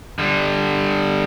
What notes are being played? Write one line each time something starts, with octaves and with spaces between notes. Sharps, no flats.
D3 G3